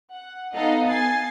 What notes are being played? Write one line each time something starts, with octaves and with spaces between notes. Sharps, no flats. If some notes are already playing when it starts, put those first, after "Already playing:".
F#5
B3 D#4 A4 D#5 F5 F#5
G#5 A6 C7